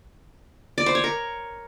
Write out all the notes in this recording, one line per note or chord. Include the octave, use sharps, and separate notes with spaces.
D5
C5
C#5
A#4